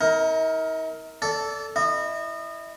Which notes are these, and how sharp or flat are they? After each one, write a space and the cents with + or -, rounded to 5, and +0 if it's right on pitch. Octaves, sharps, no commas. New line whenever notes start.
D#4 +45 A#4 +5
A4 +0 D5 -25
E4 +0 D#5 -30